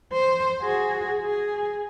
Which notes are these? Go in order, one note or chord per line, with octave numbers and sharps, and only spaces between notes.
C5
F#4 G#4
G#4